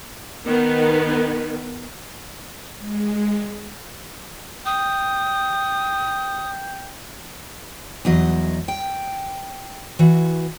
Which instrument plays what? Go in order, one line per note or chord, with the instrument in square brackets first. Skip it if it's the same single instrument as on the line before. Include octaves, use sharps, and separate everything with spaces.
[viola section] D#3 B3
[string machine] G#3
[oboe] G5 [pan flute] D#6
[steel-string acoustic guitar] E2 F#3 D#5
G5
E3 F#4